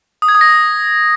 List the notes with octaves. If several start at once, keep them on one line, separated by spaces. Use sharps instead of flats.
D#6
G#6
D#6
A#6